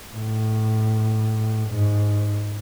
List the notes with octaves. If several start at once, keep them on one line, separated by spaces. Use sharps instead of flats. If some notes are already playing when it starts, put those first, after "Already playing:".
A2
G#2